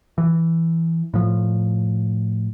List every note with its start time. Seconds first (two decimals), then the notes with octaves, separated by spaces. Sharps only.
0.18 E3
1.14 A2 F3